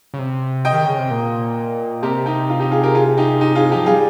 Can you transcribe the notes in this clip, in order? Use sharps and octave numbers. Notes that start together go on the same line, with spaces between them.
C#3
C3
D#5 G5
D#3
C#3
C3
A#2
C3 G4 A#4
D#4 G4
F4
D#4 G4
F4 G#4
G4 A#4
F4 G#4
D#4 G4
D#4 G4
F4 G#4
F3 D#4 G4
G3 F4 G#4